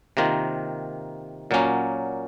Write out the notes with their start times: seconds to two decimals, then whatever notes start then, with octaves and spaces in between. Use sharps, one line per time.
0.17 C3 D#3 A#3 F4 A#4
1.51 A#2 F#3 A#3 C#4